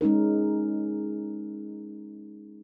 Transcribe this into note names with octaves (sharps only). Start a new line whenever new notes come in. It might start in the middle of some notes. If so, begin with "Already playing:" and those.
G#3 C#4 D#4 A#4